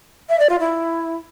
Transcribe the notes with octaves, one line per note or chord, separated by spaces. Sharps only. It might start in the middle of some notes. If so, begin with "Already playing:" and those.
E5
D5
F4
E4